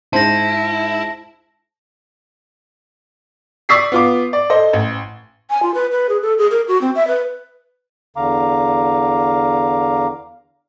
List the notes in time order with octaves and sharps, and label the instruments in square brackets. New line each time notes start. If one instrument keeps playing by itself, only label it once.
[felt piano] G#2 C5 [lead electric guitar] E4 [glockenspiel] A5 A#6
[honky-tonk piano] D5 C#6 D#6 E6 B6 C7
B3 F4 D6
D5
A4 C5 D#5
A1
[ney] G#5
F4
B4
B4
G#4
A4
G#4
A#4
F#4
C4
E5
B4
[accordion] E2 D3 F5 A#5 D6